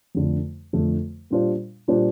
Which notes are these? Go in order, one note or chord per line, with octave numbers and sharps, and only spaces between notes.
F2 D3 A3
F2 D3 A3
A#2 G3 D4 F4 C5
A#2 G3 D4 F4 C5